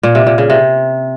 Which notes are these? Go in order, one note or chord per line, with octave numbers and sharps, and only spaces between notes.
A#2
C3
A#2
C#3
C3